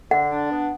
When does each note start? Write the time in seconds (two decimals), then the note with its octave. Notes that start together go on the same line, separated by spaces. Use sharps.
0.11 D3 F#5
0.30 D4
0.51 B3